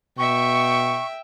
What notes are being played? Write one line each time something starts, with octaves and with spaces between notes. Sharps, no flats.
B2 E5 G5 C#6